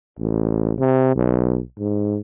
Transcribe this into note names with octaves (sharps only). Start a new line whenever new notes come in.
A1
C3
B1
G#2